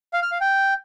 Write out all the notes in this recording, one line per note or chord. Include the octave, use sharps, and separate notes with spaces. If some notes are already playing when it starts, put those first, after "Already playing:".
F5
F6
F5
G5